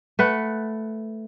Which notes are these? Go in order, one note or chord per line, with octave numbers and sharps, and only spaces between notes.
A3 B4 F#5